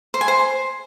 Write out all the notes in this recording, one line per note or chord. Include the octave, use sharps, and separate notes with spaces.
C5
G#5
C5